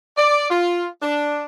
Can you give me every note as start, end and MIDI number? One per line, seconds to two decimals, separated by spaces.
0.18 0.49 74
0.50 0.86 65
1.02 1.45 62